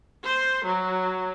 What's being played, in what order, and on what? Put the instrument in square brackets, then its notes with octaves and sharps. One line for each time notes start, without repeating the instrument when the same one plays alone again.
[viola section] C5
F#3